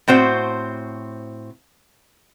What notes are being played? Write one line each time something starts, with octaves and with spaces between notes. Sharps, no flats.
A2 C4 F#4 C5